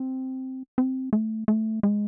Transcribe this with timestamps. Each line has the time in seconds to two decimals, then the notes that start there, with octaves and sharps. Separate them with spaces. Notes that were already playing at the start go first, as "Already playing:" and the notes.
Already playing: C4
0.78 C4
1.13 A3
1.48 A3
1.83 G#3